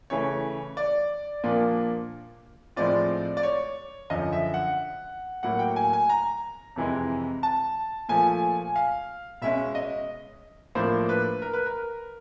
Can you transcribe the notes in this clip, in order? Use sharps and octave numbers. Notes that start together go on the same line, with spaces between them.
C#3 E3 A3 C#5
D5
A#2 F3 A#3 D4 F4
A2 F3 G#3 C4 F4 D5
D5
C#5
F#2 D3 F3 D#5
E5
F#5
A2 F#3 A#3 F#5
G5
G#5
G#5
A#5
F2 C3 E3 G#3
A5
A#2 F3 A3 G#5
F5
B2 G#3 C#4 E5
D#5
A2 F3 A#3 D4 C5
B4
A#4
B4
A#4